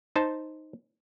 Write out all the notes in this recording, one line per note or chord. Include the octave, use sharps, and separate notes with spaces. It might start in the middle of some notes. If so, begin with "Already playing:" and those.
D#4 C5 A5